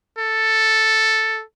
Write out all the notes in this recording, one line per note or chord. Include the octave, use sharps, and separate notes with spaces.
A4